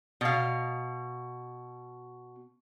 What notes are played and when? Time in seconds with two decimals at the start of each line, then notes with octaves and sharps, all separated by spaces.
0.21 B2 F5